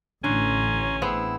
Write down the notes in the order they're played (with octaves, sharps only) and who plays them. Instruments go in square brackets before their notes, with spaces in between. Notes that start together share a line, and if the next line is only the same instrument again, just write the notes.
[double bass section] A1 [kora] D3 [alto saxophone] C#4 [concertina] C#5 A#5 C6
[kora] B3 C4 G#4 [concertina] E4 E6